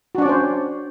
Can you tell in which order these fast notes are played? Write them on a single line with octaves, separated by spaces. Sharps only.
F#4 D4 D5 C#4 C5